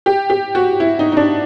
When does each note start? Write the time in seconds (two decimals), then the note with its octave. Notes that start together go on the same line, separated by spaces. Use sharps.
0.06 G4
0.30 G4
0.55 F#4
0.80 E4
0.99 D#4
1.12 D#4
1.17 D4